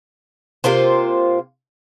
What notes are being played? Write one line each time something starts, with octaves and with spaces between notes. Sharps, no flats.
C3 A#3 F4 C5